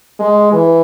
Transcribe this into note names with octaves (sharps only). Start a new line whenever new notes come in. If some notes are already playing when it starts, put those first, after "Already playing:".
G#3
E3